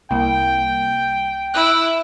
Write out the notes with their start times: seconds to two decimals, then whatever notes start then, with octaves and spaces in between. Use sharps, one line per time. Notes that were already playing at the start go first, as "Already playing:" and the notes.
0.11 C2 A#3 G5
1.54 E4 F#6 D7